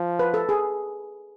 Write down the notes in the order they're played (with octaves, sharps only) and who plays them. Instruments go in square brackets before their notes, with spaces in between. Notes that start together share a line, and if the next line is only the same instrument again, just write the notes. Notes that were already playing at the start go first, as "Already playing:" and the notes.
Already playing: [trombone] F3
[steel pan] B4
A4
G#4